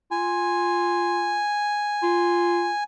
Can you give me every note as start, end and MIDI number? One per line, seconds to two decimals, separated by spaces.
0.11 1.43 65
0.11 2.84 80
2.03 2.69 65